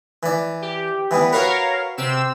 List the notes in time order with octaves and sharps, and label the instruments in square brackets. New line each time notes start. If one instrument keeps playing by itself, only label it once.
[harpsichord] E3 D5
[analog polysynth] G4
[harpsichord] E3 G3 B3
[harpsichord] F#4 B4 [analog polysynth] A#4 C#5 F5
[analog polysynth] C3 C4 E6